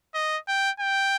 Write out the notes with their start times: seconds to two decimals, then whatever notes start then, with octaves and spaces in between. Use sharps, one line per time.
0.15 D#5
0.48 G5
0.80 G5